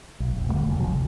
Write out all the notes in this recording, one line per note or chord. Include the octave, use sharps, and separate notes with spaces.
B1
E1 A#1
D3 G3 A3
F1 A#2
G#1 C3 F3 F#3
D2